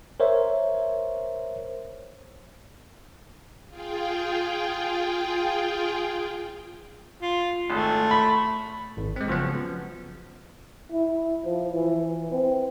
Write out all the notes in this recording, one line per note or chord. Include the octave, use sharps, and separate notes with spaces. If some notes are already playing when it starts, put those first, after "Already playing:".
A#4 C5 C#5 E5
F4 G#4 G5
F4
G#1 A3
B5
G#1
G#3 C4
C#3 F3 F#3 B3
E4
F3
E3
C4